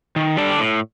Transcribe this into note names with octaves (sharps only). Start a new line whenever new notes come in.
D#3
G3 D4 A4 D5
A2